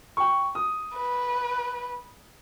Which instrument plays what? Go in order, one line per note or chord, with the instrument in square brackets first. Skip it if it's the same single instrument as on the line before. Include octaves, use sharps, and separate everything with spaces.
[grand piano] G5 C#6
D#6
[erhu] B4